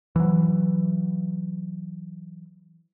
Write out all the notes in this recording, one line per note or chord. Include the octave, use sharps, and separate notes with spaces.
E3 F#3